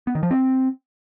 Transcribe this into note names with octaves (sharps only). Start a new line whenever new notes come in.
B3
D#3
F3
C4